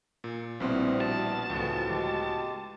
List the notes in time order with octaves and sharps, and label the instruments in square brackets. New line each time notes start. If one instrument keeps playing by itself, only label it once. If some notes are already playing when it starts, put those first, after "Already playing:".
[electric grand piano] A#2
[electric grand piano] A#1 B2 C6 [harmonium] G3 B3 E4 [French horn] C4
[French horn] F#4 [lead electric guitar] A5
[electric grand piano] C#2 A2 B3 [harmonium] D3 E3 F3
[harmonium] G#3 G4